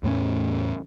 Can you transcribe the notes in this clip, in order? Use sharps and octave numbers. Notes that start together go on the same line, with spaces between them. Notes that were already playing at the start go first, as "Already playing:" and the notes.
E2 A2 B3 C#4